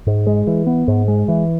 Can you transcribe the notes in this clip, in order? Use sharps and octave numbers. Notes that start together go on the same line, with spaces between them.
G#2
G#3
E3
B3
G#2
G#3
E3